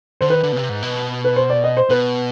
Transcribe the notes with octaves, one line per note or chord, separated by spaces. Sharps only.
D3 C5
D#3 B4
D3
B2
C3
G#2
B2
B4
C5
D5
D#5
C5
B2 B4